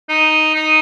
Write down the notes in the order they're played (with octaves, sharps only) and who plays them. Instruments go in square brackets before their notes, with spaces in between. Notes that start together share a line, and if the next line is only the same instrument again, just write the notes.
[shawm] D#4
D#4